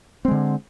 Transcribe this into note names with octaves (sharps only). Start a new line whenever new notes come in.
D3 G#3 C4